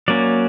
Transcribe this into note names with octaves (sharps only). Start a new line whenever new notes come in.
F#3 A#3 C#4 D5